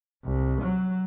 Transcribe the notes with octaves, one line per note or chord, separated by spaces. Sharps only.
C2
F#3